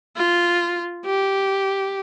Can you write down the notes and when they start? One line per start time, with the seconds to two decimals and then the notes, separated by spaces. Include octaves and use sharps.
0.16 F4
1.06 G4